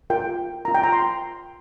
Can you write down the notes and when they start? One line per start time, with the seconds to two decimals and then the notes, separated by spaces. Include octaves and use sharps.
0.10 F4 A#4 G5
0.65 F4 A#4 A#5
0.75 G5
0.83 A#5
0.93 C6